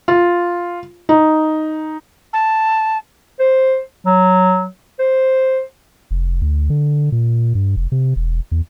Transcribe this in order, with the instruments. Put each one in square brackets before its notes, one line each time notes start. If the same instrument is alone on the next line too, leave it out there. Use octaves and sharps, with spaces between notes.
[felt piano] F4
D#4
[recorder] A5
[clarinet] C5
F#3
C5
[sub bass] F1
D2
D3
A#2
G2
F1
C3
E1
E2